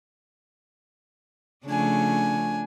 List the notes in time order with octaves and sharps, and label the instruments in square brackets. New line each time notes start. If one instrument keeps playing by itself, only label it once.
[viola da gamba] C#3 F3 A3 [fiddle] D4 G#5